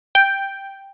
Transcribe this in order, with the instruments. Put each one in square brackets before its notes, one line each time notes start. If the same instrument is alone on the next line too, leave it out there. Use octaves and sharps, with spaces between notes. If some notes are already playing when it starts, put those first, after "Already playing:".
[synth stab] G5